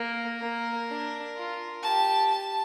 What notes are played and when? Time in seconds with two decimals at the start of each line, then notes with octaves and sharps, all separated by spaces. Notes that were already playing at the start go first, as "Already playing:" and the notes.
Already playing: A#3 A#4
0.41 A#3
0.89 D4
1.37 F4
1.83 G4 A5
2.31 A5